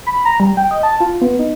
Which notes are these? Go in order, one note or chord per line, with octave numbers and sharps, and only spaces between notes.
B5
A#5
G3
G5
D#5
A5
F4
B3
D#4